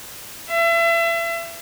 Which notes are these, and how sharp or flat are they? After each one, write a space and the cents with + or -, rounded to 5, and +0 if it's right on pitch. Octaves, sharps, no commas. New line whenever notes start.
E5 +35